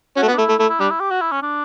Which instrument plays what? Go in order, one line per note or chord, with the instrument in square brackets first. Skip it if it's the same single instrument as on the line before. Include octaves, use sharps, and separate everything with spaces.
[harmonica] C#4 [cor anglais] F#4
[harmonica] A3
B3
[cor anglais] D4
[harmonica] A3 [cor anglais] E4
[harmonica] A3
[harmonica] A3 [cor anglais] E4
[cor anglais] E4
[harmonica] G3 [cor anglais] D4
[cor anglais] E4
G4
F#4
E4
C#4
D4